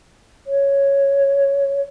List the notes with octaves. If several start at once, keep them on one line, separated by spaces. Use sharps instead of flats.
C#5